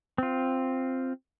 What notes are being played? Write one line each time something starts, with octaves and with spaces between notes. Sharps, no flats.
C4 F4